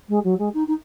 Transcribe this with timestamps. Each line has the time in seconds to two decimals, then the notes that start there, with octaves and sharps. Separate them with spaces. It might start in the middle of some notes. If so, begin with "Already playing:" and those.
0.09 G#3
0.24 F#3
0.38 G#3
0.54 D#4
0.67 D#4